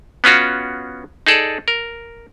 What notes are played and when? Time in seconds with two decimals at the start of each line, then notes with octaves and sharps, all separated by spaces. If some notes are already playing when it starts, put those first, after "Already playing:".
0.24 B3 C#4 F4 F#4
1.27 D#4 G#4 A4 D5
1.68 A#4